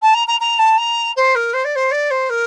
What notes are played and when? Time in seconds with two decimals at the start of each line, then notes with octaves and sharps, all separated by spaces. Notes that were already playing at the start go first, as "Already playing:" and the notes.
0.02 A5
0.14 A#5
0.28 A#5
0.41 A#5
0.59 A5
0.78 A#5
1.16 C5
1.35 A#4
1.54 C5
1.65 D5
1.76 C5
1.92 D5
2.11 C5
2.30 A#4